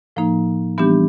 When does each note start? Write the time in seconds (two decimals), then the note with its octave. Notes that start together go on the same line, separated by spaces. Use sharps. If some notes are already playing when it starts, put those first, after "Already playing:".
0.16 A2 F3 A#3 D#4
0.78 E3 G3 B3 D4 G4